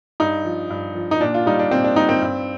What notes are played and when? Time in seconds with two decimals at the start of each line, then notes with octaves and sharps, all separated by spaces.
0.20 G2 D#4
0.45 F3
0.70 G2
0.95 F3
1.11 D#4
1.21 A#2 D4
1.34 F4
1.46 G3 D#4
1.59 D4
1.71 A#2 C4
1.84 D4
1.96 G3 D#4
2.09 C4
2.22 G2